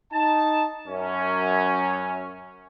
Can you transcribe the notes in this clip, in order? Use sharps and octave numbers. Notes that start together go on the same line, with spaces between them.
D#4 A5
F#2 C#4